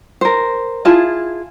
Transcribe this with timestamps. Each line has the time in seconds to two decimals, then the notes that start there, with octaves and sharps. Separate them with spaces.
0.21 A#4 C5
0.85 E4 F4 G#4 A5